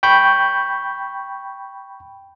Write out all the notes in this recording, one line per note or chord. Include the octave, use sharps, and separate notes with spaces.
G5 B5 C#6 G6